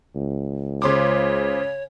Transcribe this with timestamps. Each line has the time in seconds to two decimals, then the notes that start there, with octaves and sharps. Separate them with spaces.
0.15 C#2
0.82 C#3 C5 C#5 C6 D6